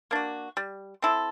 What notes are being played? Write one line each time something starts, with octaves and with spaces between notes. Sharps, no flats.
A#3 D4 F#4
G3
C4 E4 A4